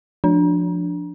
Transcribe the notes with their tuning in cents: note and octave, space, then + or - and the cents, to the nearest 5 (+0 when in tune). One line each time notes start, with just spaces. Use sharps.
F3 +0 D4 +0